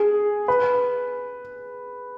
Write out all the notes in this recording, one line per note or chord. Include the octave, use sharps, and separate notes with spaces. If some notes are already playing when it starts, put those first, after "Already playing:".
Already playing: G#4
B4